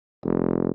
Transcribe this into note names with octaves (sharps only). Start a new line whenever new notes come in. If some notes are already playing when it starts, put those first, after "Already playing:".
F1